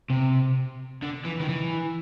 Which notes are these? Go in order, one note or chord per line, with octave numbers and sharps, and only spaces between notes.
C3
D3
E3
D#3
E3